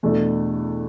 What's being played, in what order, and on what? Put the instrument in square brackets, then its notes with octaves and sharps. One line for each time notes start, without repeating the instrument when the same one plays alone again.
[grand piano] E2 B2 A3 D4